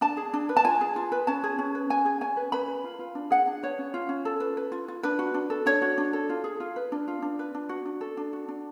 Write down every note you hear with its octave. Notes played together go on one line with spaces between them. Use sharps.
D4 A5
G#4
D4
B4
A5
F4 G#5
G#4
F4
B4
C#4 A5
G#4
C#4
B4
C#4 G#5
G#4
C#4 G#5
B4
B4 B5
B4
F4
F4
D4
G#4 F#5
D4
B4 C#5
C#4
F4
C#4
A4
B4
B4
F4
F4
D4 B4
F#4
D4
A4
D4 C#5
F#4
D4
A4
F4
G#4
F4
B4
D4
F4
D4
B4
D4
F#4
D4
A4
D4
F#4
D4